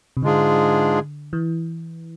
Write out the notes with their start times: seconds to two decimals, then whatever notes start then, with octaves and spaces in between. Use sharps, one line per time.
0.17 C3
0.22 G#2 D3 G#3 D4 F4 G#4
1.33 E3